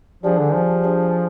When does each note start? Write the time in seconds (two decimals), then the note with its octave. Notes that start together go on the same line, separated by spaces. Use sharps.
0.23 F3 G3 D4 G#4
0.39 D3
0.54 F3
0.83 D4 G#4 C5